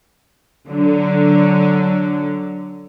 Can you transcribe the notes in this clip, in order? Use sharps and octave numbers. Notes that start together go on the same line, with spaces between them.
D3 F#3